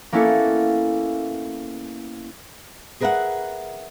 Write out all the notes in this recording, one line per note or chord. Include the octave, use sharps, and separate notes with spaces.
A#3 B3 C#4 E4 A4
G#4 A#4 B4 D#5 E5 F#5